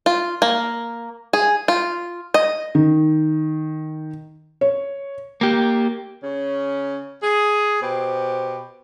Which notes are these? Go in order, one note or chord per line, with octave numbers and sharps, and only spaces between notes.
F4
A#3
G#4
F4
D#5
D#3
C#5
A#3 G4
C#3 C#4
G#4
B2 G4 C5